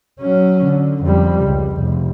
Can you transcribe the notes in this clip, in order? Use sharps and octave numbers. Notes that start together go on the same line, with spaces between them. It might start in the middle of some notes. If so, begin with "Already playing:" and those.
F#3 C#4
D3
F2 G3
C#2
F1